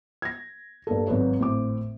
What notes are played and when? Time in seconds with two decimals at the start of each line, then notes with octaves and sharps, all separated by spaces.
0.22 G#6 A#6
0.87 G2 A#3 A4
1.07 G#1 G#2 F#3 F#4 B4 C#5
1.39 G#1 A2 C5 D6